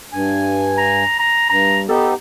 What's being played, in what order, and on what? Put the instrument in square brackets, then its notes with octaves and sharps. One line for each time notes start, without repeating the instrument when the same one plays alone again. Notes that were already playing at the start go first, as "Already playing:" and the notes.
[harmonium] G2 G#5
[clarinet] A#5
A#5
[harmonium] G2 [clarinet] A#5
[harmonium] B3 D#4 G4 [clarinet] A4